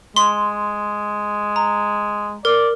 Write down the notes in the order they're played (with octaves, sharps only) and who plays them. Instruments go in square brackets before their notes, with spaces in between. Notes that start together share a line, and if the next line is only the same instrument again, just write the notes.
[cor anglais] G#3 [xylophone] C6
[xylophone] A#5
[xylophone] A#4 [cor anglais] D5